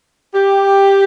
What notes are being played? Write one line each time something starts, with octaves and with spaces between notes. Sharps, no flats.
G4